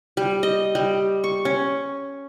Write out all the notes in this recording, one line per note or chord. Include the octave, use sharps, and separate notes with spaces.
G3
D#5
G3
C#6
C#4